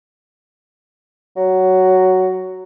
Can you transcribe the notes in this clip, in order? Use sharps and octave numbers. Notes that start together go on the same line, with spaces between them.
F#3